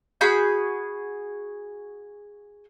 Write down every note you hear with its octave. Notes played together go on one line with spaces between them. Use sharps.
F#4 G#4 B5 G6